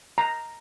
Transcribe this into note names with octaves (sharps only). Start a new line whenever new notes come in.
A#5